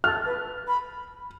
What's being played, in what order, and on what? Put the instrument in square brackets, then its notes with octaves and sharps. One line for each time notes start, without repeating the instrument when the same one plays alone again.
[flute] A4 [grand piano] F6
[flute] B4
B5